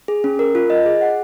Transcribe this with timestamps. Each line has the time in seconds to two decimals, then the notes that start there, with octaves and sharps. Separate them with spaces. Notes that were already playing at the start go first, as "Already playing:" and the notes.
0.08 G#4
0.24 C#4
0.39 A#4
0.55 F4
0.70 D#5
0.86 G#4
1.01 F#5